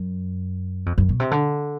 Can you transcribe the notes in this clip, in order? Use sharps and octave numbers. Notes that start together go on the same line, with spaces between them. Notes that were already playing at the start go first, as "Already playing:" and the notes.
Already playing: F#2
F2
F#2
B2
C3
D3